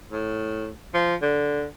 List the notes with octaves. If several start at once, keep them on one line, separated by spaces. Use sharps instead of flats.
A2
F3
D3